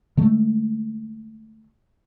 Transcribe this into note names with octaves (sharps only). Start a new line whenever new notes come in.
D3 G#3 A3